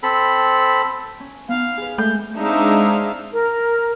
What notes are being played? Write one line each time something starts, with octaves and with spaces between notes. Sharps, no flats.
C4 A4 B5
C#4
B3 D#4 F5
G#4 B4
G#3 A3 E5 G6
G#3 C4 D4 D#4 E5 F5
A#4